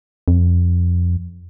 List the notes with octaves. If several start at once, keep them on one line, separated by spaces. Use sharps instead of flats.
F2